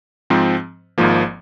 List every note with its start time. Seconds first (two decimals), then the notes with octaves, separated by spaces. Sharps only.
0.30 G#2 F3 C4
0.98 G#1 G#2 F3 A#3